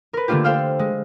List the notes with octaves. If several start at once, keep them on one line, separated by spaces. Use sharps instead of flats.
A#4 B4
D3 A3 A#3 D4 F4 G4
A4 C5 F5 G5 E6 F6
G#3